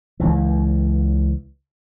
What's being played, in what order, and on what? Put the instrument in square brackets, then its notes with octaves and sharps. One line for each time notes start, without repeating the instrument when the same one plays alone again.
[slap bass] C#2 E3